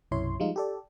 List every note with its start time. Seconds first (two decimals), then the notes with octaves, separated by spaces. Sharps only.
0.11 B1 F#2 C3 E4 C#5 C6
0.40 F3 G3 G#3 D#4 F4
0.56 G4 A4 D5